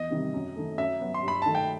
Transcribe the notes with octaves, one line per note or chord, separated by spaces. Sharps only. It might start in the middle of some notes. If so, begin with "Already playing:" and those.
Already playing: E2 D#5
C3 D#3 G3
F#2
D#3 A3
F#2 E5
F#3 B3
C6
G2
B5
D#3 A3 A5
G5